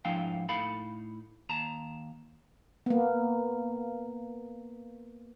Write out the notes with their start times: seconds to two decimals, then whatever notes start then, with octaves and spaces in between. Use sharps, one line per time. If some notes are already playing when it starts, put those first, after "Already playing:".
0.05 G#2 F3 D4 E4 F5 G5
0.49 A2 D#4 A4 F5 B5
1.49 D#2 A5 A#5
2.86 A#3 B3